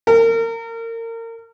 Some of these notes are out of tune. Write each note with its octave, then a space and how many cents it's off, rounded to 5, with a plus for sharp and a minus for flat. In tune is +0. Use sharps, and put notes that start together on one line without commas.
A#4 -30